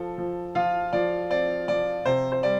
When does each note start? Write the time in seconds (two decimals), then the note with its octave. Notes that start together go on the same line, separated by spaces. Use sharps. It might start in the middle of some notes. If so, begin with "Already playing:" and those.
Already playing: F3 A4
0.18 F3
0.55 F3 F4 F5
0.93 F3 D5
1.30 C4 D5
1.68 F3 D5
2.05 C3 C5
2.32 C5
2.43 G3 D5